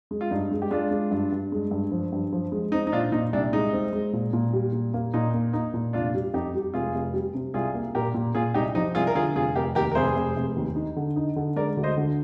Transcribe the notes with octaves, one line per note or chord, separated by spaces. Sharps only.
G#3
F4
G2 D#4
G#3
G4
G#3 D4 F4
G#3
G2
G2
G#3
G2
F3
G2
F3
G#3
C4 D#4
D#4
A#2 D4 F4
A#2 D#4
C2 D4
G#3 D#4
C4
G#3
A#2
A#2
G3
A#2
A#3
A#2 D#4
A#3
A#3 D#4
A#2
F1 D4 F4
G3
F2 D#4 G4
G3
F1 F4 G#4
F1
G3
C3
C2 F4 G#4
A#3
A#2 G4 A#4
A#2
A#2 F4 G#4
C2 D#4 G4
F3 D#4
C2 F4 G#4
A#4
D3 F4 G#4
F1 F4 G#4
F1 G4 A#4
D#2 G4 A#4
A#4
F1 G#4 C5
F1
F1
D#2
D#4
D3
D#4
D3
G#3 A#4 D5
D2
C5 D#5
D3